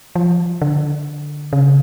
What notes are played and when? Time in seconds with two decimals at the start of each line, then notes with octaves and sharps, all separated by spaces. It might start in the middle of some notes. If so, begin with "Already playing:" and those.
0.16 F3
0.62 D3
1.53 C#3